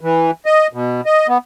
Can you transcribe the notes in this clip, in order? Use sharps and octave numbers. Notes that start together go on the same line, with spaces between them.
E3
D#5
B2
D#5
B3